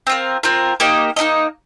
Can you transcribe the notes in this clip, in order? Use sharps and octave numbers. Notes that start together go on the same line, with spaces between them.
C4 F4 A#4
C4 F4 A#4
A#3 D#4 G4 D#5
A#3 D#4 G4 D#5